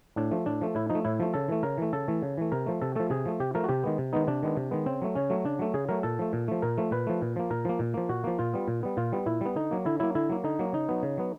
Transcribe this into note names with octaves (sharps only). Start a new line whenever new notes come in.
A2 D4
F3 A3
A2 D4
F3 A3
A2 E4
F3 D#4
A3
A2 E4
F3 A3
C#3 A4
E3 A3
C#3 A#4
E3 A3
C#3 A4
E3 A3
C#3
E3 A3
C3 A#4
F3 A3
C3 A4
F3 A3 A4
C3 G#4
F3 A3
C3 G4
F3 A3 A#4
F#4
C3 G4
D#3 G#3 B3
C3
D#3 G#3 B3 D#4
C3 D4
D#3 G#3 B3
C3
D#3 G#3 B3
C#3 C4
F#3 A3
C#3 C#4
F#3 A3
C#3 D4
F#3 A3
C#3 G#4
F#3 A3 A#4
A#2 A4
F3 A3
A#2
F3 A3
A#2 A#4
F3 A3
A#2 B4
F3 A3
A#2
F3 A#3
A#2 A#4
F3 A#3
A#2
F3 A#3
A#2 F#4
F3 A#3
A#2 F4
G3 B3
A#2
G3 B3
A#2 F4
G3 B3
A#2 E4
G3 B3
D3 D#4
F#3 A#3
D3 E4
F#3 A#3 E4
D3 E4
F#3 A#3
D3 D#4
F#3 A#3
C#3 D#4
F#3 B3
C#3
F#3 B3